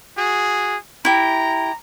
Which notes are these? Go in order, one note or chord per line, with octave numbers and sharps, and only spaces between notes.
F#4 G#4
E4 G4 A#5